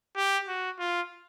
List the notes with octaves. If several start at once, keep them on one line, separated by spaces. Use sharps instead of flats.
G4
F#4
F4